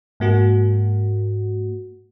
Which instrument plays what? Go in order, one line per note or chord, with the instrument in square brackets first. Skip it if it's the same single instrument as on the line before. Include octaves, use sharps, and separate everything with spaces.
[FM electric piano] G#2 A#3 F#4